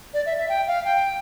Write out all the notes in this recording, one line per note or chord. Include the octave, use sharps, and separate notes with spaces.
D5
E5
E5
G5
F5
G5